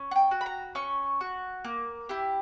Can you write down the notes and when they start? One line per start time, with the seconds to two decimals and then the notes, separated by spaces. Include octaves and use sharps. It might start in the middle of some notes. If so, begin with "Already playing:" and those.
Already playing: C#4
0.11 F#5
0.16 G5
0.31 F#4
0.41 B5
0.46 A#5
0.75 C#4 C#6
1.21 F#4
1.64 A#3
2.09 E4 G4